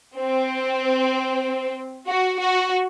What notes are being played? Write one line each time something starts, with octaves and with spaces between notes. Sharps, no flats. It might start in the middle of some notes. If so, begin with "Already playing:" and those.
C4
F#4
F#4